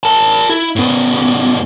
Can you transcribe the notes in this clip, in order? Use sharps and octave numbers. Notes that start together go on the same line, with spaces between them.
A#4 A5
E4
A2 B3